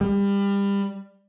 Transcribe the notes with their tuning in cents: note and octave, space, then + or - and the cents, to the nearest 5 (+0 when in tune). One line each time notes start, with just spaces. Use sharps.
G3 +25